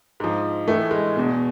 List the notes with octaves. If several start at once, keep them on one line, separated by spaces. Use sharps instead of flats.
G#2 F3
A2 E3 A3
G#3
E2 B2